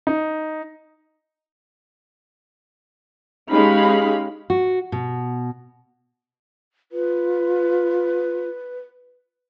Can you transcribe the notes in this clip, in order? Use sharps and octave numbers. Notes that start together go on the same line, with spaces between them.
D#4
G#3 C#4 D#4 G4 F5 B5
F#4
B2
F4 B4